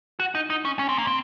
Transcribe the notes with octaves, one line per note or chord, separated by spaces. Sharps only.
F#4
D#4
D#4
C#4
C#4
C4
A#3
C4